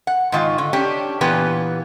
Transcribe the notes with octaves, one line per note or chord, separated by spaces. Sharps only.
F#5
G#2 D#3 F4
D3
C#4 D4 G4
A#2 E3 B3 G4 B4